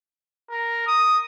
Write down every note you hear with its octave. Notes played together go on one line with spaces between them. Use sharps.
A#4
D#6